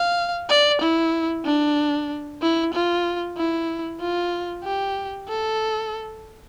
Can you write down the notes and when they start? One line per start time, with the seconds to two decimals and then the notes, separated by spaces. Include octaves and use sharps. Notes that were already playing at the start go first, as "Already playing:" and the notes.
Already playing: F5
0.49 D5
0.81 E4
1.45 D4
2.42 E4
2.74 F4
3.37 E4
4.00 F4
4.64 G4
5.28 A4